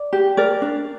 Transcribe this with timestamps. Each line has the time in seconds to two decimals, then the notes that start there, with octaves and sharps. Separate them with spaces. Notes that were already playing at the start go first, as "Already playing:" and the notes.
Already playing: D5
0.13 G4
0.37 A#4 D5
0.62 D4